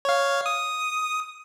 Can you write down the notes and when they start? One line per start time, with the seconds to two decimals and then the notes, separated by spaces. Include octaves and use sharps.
0.05 C#5 F5
0.46 D#6